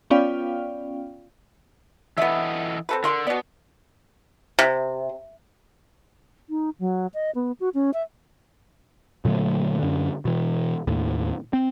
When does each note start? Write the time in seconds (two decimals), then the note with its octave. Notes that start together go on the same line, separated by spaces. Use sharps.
0.10 B3 C#4 F4 D5 F5 G5
2.18 E3 B3 A4 D#5 E5
2.89 C4 A4 B4
3.04 D3 A#4 C6
3.27 B2 B3 D5
4.59 C3
6.50 D#4
6.79 F#3
7.14 D#5
7.35 B3
7.60 F#4
7.74 C#4
7.94 E5
9.25 A#2 D3 F#3 A3
9.79 F#2 D3
10.25 B2 E3
10.87 D#2 A2
11.53 C4